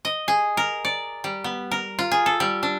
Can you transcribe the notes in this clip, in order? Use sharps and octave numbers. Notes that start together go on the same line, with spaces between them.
D#5
G#4
A#4
D5
G3
B3
A#4
F4
G#4
A4
G3
D4